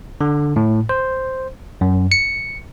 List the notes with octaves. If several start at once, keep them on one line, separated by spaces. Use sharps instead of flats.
D3
A2
C5
F#2
C#7